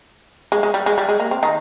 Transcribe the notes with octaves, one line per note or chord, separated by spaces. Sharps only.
G#3
G#3
G3
G#3
G3
G#3
A#3
C4
D#3 D#4